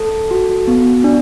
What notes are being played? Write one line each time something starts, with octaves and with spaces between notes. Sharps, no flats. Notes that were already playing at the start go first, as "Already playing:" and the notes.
Already playing: A4
F#4
B3
D4